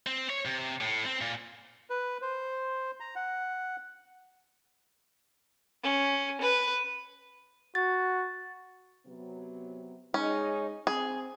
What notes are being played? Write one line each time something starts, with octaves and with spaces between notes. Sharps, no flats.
C4
C#5
C3
A2
C4
A#2
B4
C5
A#5
F#5
C#4
B4
F#4 A6
C3 F#3 B3
G#3 C#4 D#4
C4 G#4